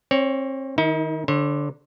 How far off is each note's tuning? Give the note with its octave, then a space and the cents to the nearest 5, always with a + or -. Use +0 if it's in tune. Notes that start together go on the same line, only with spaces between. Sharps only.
C4 +35 C#5 +15
D#3 +0 D#4 +45
D3 -5 C#5 -45